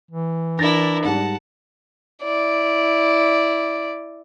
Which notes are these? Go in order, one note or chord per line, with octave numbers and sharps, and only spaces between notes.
E3
D4 E4 A#4 A6 A#6
G#2 G3 F#5 A5
E4 D5